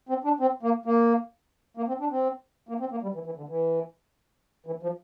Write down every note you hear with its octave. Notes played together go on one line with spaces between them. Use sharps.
C4
D4
C4
A#3
A#3
A#3
C4
D4
C4
A#3
C4
A#3
G3
E3
E3
D3
E3
E3
F3